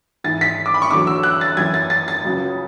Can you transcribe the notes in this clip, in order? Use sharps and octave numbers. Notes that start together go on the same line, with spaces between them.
G#2 E3 A6
B6
D6
B5
C#6
E2 D3 F#3 D6
E6
F#6
A6
F#2 E3 G#6
A6
A6
A6
C#2 C#3 F#3